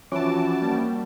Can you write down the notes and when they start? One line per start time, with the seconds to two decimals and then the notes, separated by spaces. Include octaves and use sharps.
0.12 E3 F3 C#4 F#4 A5 D6
0.62 G3 A#3